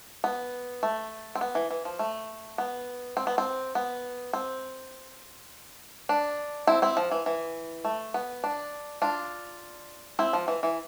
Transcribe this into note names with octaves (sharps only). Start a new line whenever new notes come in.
B3
A3
C4
B3
E3
E3
F3
A3
B3
C4
B3
C4
B3
C4
D4
C4 E4
C4 E4
F3
E3
E3
A3
B3
D4
D4 F4
C4 E4
F3
E3
E3